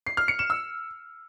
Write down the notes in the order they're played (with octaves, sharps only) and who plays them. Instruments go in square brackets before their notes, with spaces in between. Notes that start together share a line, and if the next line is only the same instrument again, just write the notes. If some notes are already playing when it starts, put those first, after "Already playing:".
[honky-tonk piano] C7
F6
C#7
E7
E6